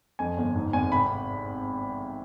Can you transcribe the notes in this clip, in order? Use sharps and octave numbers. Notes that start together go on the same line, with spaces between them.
F2 G#5
G1
G#2
G#1 G#5
C3 B5